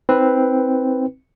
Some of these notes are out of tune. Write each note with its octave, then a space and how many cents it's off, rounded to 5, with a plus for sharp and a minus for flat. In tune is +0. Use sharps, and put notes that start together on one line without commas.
C4 +0 D#4 +35 B4 +0